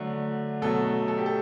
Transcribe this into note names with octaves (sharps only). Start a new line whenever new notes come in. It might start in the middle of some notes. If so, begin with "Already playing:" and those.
Already playing: D3 F#3 A3
B2 F#3 A3 A4
A4
G4
A4